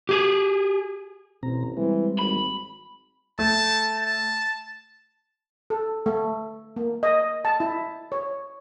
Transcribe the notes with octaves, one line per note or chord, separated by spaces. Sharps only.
G4 G#4
A1 B2 C4 A#5
E3 G3 G#3 C4
G#1 B5
A3 A5
A5
A4
A3
A#3
D#5
A5
E4
C#5